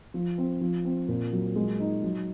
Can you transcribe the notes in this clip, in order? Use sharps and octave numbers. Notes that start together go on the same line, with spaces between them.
F3
C4
F3
C4
A#2
F#3
G#3
D#4
F#3